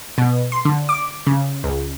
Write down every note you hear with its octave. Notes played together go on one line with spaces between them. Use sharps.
B2
C6
D3
D6
C#3
C#2